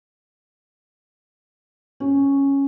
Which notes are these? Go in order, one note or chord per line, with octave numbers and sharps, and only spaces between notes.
C#4